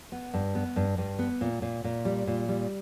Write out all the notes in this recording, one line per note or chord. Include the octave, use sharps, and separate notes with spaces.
B3
G2
B3
G2
G2
B3
A#2
A#2
A#2
G3
A#2
G3